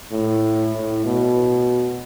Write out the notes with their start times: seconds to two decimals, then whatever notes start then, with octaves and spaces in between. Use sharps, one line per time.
0.11 A2
0.73 A2
1.05 B2